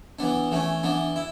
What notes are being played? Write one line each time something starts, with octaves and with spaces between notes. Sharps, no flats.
E3 B3 D4
E3 A3 C#4
E3 B3 D4
E4